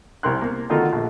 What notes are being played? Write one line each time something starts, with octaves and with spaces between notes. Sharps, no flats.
C2 A#4 C6 F#6
A#3
D3 D#3 A3 F4 F#4 A4
A#1